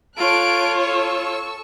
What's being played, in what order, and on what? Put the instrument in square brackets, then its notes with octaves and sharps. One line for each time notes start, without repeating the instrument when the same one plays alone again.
[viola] F4 C#5 [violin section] A4 F#6 D7
[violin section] A4 C#6 E6